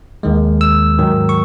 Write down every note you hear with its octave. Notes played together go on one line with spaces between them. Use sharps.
D#2 D#3 G#3
E6
G#2 D#3 F#3
C#6